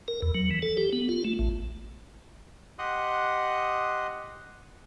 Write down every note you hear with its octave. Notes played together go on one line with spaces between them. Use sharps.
A#4
E2
F#3
E3
A4
G4
B3
F4
A3
A1
G4 D#5 F#5 C6 D#6 F#6